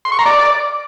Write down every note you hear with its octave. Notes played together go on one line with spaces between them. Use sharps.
C6
C#6
A#5
D5